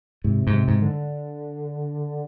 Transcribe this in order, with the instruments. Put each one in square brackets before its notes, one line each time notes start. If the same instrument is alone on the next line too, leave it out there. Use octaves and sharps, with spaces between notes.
[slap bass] G#2 [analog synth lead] C3
[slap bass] G#2
[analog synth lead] C3
[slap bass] G#2
[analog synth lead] D3